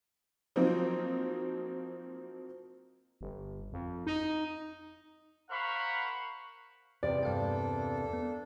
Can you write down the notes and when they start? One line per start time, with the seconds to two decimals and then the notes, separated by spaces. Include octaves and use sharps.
0.56 F3 F#3 A#3 C4 D#4
3.21 G1
3.73 F2
4.06 D#4
5.50 A#4 C5 F5 F#5 B5 C#6
7.03 E2 C3 D5
7.23 G2 A#3 D4 A4 F5 G5
8.13 B3